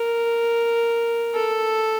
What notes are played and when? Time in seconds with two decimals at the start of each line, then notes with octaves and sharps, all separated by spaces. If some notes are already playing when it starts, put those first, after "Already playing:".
Already playing: A#4
1.34 A4